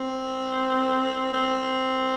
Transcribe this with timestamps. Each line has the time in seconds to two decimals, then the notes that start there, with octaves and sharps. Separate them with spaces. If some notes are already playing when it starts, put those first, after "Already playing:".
Already playing: C4
1.33 C4